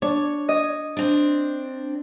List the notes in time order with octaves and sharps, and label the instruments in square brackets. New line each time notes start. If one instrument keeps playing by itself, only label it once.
[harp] D4 [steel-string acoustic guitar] C#5
[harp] D#5
[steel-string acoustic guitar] C4 D4